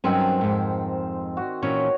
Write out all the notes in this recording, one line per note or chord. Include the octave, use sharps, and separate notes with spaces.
G2 D#3 F#3 C4 C#4 C5
F2 G#2
F#4
A#2 E3 C#4 C#5